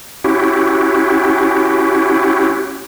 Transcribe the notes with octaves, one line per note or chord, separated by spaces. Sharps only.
C#4 E4 F#4 G4